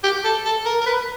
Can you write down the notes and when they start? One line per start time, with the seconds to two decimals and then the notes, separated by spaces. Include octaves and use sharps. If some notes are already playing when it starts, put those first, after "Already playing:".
0.04 G4
0.24 A4
0.45 A4
0.66 A#4
0.81 A#4
0.86 B4